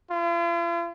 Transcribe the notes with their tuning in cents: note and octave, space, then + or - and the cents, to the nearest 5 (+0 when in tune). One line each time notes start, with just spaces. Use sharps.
F4 -45